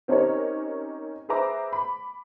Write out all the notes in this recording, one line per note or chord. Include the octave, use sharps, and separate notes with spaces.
C4 C#4 D#4 G4 A#4 C#5
G#4 B4 C5 E5 A#5 D6
B5